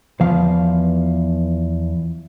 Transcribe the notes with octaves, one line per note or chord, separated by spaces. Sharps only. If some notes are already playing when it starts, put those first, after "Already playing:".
E2 F3 B3 F5